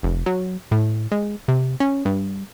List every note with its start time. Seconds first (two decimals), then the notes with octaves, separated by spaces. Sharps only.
0.03 F1
0.26 F#3
0.71 A2
1.12 G#3
1.48 C3
1.80 C#4
2.05 G2